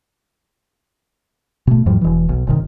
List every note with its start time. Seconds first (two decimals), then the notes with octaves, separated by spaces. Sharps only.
1.67 B2 A3
1.86 E2 G#2 F3 G3
2.01 E1 E3
2.29 B1
2.47 G1 C3 D#3